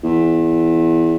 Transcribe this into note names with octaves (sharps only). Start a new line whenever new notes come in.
E2